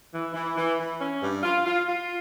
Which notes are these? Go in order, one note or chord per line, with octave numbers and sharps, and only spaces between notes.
E3
E3
E3
E3
C#4
G2
F4
F4
F4